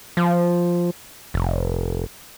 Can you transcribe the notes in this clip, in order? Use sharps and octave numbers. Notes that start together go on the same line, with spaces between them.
F3
F1